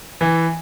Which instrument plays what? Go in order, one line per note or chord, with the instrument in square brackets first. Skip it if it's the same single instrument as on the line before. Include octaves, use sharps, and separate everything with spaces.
[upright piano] E3